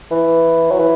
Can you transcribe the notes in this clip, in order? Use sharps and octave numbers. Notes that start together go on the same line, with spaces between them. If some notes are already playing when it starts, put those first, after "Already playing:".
E3
F#3
E3